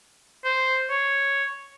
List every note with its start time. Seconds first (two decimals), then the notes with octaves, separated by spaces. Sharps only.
0.45 C5
0.90 C#5